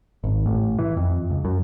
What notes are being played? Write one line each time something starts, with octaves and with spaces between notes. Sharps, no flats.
G#1
A1
E3
F2
C#2
F#2